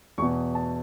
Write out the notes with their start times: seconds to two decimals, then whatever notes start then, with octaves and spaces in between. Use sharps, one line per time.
0.18 E2 B2 C#6
0.55 A5